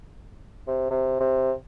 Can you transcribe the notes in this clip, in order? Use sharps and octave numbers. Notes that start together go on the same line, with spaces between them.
C3
C3
C3